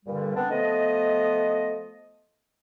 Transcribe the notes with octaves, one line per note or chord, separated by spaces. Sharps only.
G2 A#2 D3 G3
B3 C4 D4
F3 A3 B3 D#5